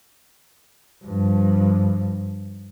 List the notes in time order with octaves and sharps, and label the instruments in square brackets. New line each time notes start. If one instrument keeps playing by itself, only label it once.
[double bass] G2 F3